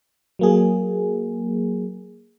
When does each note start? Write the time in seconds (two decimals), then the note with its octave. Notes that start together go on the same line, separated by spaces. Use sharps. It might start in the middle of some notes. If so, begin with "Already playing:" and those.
0.39 F#3 A#3 G#4